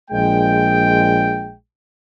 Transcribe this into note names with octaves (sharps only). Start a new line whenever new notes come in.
A#1 G#3 G5